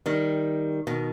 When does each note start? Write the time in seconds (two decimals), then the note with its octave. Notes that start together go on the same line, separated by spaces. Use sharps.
0.06 D#3 G3
0.87 B2 D#3